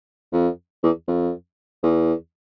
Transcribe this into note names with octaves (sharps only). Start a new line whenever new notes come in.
F2
E2
F2
E2